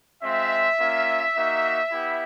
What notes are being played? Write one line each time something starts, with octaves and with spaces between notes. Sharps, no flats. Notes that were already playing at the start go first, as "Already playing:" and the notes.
G#3 C4 F4 E5
A#3 C#4 F4
A#3 D#4 F#4
B3 E4 G4